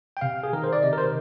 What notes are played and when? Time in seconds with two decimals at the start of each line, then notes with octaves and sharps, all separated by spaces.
0.17 G5
0.21 C3 F5
0.43 G#4
0.53 D#3 A#4
0.64 C5
0.73 D5
0.83 C3 D#5
0.93 A#4
0.98 C5